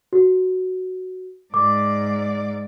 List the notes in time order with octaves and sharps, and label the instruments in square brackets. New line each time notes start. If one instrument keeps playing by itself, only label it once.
[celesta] F#4
[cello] G#2 D5 [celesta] D6